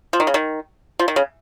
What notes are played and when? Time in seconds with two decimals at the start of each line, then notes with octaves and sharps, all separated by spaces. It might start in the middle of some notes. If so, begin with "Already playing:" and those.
0.13 F3
0.20 D#3
0.27 C#3
0.34 D#3
0.99 F3
1.08 D#3
1.16 C#3